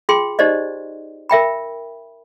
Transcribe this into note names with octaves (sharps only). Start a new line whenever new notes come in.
F4 G#4 G5 C6
D#4 G4 C5 D5 D#5
A#4 E5 G5 B5